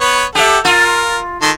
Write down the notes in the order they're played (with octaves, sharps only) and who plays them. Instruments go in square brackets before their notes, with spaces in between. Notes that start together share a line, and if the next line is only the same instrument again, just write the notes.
[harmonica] B3 B4 C#5
[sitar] G4 E5 [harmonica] A4 F#5
[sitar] F4 [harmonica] A#4
[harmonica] D#3 A4 C6